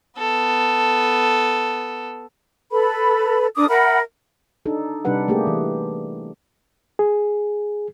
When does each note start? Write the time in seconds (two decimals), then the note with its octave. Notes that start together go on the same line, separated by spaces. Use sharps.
0.18 B3 A4
2.71 A4 B4 B5
3.56 D4 A#4 D6 D#6
3.69 A#4 E5 F#5 B5
4.66 D4 D#4 A4
5.05 C3 G3 D4 D#4 B4 F#5
5.28 A3 A#3 G4 G#4
5.47 E3
6.99 G#4